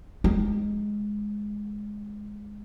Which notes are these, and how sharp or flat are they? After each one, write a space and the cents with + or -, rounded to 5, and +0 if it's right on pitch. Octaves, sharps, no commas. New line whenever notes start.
G#3 +0